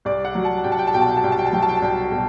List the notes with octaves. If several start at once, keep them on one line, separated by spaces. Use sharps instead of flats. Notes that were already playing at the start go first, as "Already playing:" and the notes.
C2 D5
F#5
F#3
A5
C2 G5
A5
G5
A5
B2 G5
A5
G5
A5
C2 G5
A5
G5
A5
F#3 G5
A5
G5
A5
C2 G5
B2